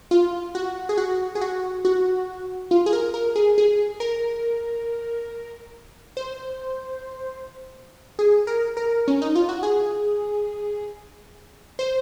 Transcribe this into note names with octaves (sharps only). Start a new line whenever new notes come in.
F4
F#4
G#4
F#4
G#4
F#4
F#4
F4
G#4
A#4
A#4
G#4
G#4
A#4
C5
G#4
A#4
A#4
C#4
D#4
F4
F#4
G#4
C5